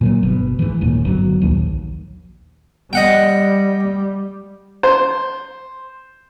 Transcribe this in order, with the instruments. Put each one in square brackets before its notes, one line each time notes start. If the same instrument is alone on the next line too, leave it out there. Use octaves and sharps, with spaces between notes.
[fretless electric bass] A#2 F3 F#3
G1 B2
G#2 E3
D#1 D#2 A#2
G1 F#3
A#1 D#2
[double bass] G3 [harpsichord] D#5 F#5 G5
[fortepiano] C5